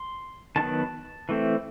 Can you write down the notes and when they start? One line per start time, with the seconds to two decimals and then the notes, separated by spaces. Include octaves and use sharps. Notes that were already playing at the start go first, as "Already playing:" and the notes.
Already playing: C6
0.56 D#3 F#3 B3 A5
1.29 E3 A3 C4